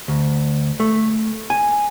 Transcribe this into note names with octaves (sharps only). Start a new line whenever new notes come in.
D2
A3
G#5